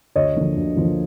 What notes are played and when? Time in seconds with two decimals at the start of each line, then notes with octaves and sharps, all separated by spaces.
0.16 D2 C#5 D#5
0.36 D3 F3 A#3
0.56 D2
0.76 D3 F3 A#3